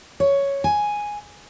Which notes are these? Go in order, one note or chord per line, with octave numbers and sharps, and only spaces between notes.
C#5
G#5